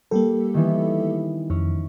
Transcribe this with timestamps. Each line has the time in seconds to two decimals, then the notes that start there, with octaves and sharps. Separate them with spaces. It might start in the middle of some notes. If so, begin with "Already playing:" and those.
0.11 G3 A#3 G4 A4
0.54 D#3 E3 B3
1.50 F2 C#4